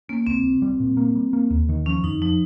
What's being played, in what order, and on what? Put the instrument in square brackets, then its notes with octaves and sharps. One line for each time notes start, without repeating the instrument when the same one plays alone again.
[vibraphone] A#3 [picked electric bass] C#4
[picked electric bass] C2 [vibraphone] C4
[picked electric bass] C2
G3
A#2
A#3
G3
A#3
D#2
D#3
[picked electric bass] F3 [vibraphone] C#4
[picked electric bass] F2 [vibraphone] D#4
[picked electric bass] F3 [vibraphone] D#4